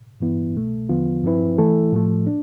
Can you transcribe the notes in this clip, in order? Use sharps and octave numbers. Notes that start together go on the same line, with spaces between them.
G2 E3 B3 E4
C2 B2 A3
E2 D3 F3 B3 F4
G2 F3 C4 E4 B4
E3 A3 E4 A4
A2 F3 A3
D4